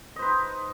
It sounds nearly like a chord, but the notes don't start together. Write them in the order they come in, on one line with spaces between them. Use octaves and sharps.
D#5 C5 B4 D#4